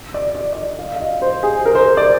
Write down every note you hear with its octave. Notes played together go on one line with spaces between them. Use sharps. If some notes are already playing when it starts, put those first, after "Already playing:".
D5
D5
D5
D#5
F5
F5
D#5
C5
G#4
A#4
C5
C5
D5